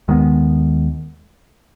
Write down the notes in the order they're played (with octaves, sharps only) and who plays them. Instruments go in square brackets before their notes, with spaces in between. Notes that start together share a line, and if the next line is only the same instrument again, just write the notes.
[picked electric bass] D#2 D#3 G#3 B3